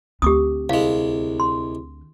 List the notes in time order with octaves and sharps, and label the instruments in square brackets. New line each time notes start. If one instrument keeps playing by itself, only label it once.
[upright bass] D2 C4 [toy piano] G4 D6 D#6
[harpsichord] C2 G#3 [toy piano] F5
[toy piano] C6